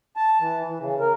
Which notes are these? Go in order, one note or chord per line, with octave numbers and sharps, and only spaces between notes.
A5
E3
E3
C#3
A#4